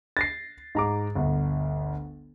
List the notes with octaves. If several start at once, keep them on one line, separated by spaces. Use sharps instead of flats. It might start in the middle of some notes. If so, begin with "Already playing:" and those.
A6 A#6 C7
G#2 A#5 D6
G1 D2